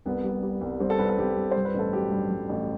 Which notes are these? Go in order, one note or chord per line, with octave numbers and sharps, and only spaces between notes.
C2 B3
G3
G3
C2
G3 C4
A4
C2 B4
A4
C2 G4
C2
G2 C5
B4
A1 A4
F#3 G4
G2
G2
A1